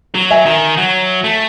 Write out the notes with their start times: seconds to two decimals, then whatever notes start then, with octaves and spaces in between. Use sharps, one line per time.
0.15 F#3
0.31 E5 G#5
0.46 D#3
0.77 F#3
1.24 A3